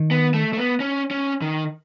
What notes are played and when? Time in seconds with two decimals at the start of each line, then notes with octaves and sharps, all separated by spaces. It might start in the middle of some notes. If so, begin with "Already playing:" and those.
Already playing: D#3
0.11 B3
0.34 A3
0.53 A3
0.58 B3
0.80 C#4
1.11 C#4
1.42 D#3